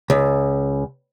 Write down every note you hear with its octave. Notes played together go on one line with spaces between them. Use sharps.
C#2